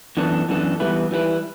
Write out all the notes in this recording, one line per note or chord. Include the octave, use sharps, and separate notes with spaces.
F#2 E3 B3 D4 A4
F#2 E3 B3 D4 A4
E3 G3 B3 E4 B4
E3 G3 B3 E4 B4